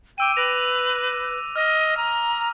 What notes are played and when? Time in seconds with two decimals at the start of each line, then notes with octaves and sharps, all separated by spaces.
0.18 G5 D6 E6 D#7
0.37 B4 E6 A#6 F7
1.56 D#5 F6
1.97 A#5